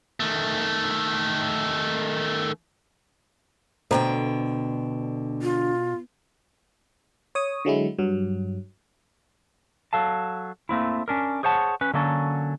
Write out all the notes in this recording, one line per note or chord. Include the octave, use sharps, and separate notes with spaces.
D#3 A3
D2 B2 D3 A4 C5 G5 A#5
F4
C#5 D#6
D3 F#3 G#3 E4
G2 F#3
F#3 A4 F5 A5
A3 A#3 C4 E4
C#4 D4 A#4
G#4 C5 C#5 F#5 A5
C#4 B4
D3 F#3 A#3 C#4 A4